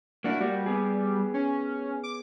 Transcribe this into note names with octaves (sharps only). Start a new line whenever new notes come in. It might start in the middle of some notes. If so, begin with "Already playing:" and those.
A#3 D4 E4 F#4
G3 A#3 F#4
B3 G#4
C#4
D6